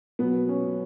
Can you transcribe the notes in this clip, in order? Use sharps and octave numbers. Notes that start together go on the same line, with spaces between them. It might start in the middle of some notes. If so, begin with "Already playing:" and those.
B2 F#3 B3
C#4